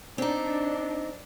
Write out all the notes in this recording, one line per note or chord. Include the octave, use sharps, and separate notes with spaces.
C4 D4 D#4